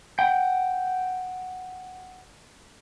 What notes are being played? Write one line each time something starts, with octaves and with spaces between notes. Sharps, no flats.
F#5 G5